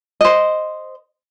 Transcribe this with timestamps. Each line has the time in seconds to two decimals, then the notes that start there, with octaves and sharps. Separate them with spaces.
0.21 C5 D#5